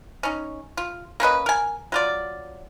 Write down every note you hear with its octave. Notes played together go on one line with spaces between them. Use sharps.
C#4 D#4
F4
A#3 C#4 B4 D#5
A#4 G#5
F#3 F4 D5